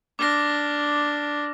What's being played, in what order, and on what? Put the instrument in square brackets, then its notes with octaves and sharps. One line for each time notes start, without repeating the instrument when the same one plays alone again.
[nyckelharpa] D4 [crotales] D6 F6 A#6